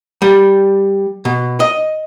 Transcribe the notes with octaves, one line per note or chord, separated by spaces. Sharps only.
G3
B2
D#5